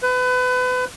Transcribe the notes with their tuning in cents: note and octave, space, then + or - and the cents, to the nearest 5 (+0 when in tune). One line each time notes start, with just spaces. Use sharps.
B4 +30